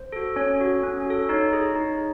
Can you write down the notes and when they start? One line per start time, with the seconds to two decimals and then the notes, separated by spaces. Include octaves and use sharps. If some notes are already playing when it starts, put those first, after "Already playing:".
Already playing: C5
0.12 F#4 A4
0.36 C#4 C#5
0.60 F#4 A4
0.83 C#4
1.06 F#4 A4
1.29 D#4 C#5
1.53 G#4
1.76 D#4